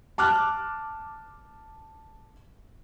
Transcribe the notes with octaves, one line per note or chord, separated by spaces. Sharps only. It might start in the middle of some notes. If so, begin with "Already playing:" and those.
A5 D6 F6 F#6